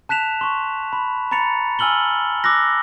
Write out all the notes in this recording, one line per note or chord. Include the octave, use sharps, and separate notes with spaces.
A5 F#6 B6 E7 F7
C6 C#6
B5
A#5 B5 A6 C#7 F7
G#5 E6 F6 F#7 G7
D6 E6 F#6 A#6